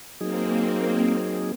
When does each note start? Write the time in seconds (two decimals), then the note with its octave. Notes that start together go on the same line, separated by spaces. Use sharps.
0.21 F#3 A#3 C4 D#4 G#4